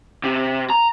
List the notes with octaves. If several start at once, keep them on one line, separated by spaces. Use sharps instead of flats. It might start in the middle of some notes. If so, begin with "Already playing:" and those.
C3
A#5